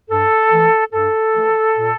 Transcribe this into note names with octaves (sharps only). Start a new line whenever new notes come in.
G2 A4
E3 A3
G2 A4
E3 A3
A#2